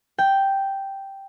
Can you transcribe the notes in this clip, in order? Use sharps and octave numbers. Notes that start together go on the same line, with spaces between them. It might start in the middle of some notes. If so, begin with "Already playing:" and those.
G5